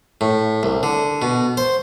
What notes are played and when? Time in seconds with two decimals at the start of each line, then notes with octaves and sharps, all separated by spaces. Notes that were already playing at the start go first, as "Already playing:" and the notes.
0.21 A2
0.63 C2
0.83 D3
1.22 B2
1.57 C5